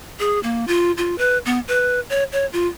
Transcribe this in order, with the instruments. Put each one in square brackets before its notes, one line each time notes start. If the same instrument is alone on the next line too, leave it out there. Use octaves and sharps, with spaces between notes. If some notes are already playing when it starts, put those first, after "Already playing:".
[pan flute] G#4
A#3
F4
F4
B4
B3
B4
C#5
C#5
F4